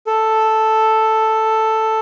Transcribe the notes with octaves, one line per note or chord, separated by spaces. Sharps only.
A4